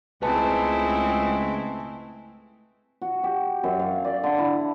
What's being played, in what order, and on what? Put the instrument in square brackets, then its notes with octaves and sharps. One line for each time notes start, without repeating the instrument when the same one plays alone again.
[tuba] C#2 [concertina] G#3 [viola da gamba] A3 C4 E4 [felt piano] B4 A5
[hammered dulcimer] F#4
G4
F#2
F5
D5
D3
E4